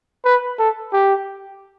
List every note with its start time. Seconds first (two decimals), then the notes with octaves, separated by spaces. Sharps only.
0.25 B4
0.59 A4
0.93 G4